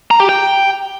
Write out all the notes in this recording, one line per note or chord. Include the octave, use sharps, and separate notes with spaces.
A#5
G4
G5